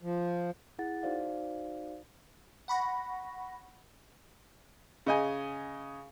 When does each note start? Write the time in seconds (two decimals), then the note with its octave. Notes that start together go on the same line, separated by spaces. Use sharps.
0.02 F3
0.79 E4 G#4 F#5 A6
1.03 D#4 F#4 C5 D5 F5
2.68 F#5 B5 C#6 A#6
5.06 C#3 D#5 G#5